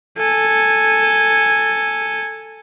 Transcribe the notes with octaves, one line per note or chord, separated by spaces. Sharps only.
A4 G#5